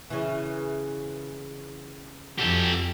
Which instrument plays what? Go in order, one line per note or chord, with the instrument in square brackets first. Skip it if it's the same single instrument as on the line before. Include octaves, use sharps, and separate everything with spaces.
[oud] C#3 E3
[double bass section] F2 [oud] F#4 [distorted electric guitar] G4 A4